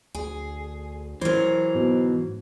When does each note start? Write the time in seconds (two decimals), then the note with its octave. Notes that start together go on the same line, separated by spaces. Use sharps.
0.15 D2 G#4
1.21 E3 F#3 A#4 C5
1.75 G#2 B2